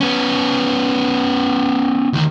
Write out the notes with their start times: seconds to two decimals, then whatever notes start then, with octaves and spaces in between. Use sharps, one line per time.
0.01 B3 C#4
2.13 D2 D#3